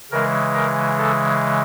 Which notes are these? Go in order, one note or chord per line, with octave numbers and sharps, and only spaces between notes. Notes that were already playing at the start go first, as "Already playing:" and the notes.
C#3 E3 G#3 A#4
A#4
A4